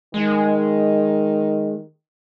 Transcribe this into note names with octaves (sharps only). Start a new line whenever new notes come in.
D#3 G#3